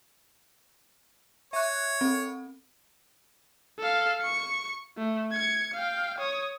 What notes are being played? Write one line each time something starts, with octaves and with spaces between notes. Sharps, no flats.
C#5 E5 F#6
C4 A4
A4 F5
C#6 C#7
A3
G#6 C#7
F5 G5
C#5 D#6